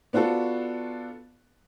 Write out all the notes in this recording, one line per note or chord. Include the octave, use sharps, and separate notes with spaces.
B3 D4 F4 F#4 A4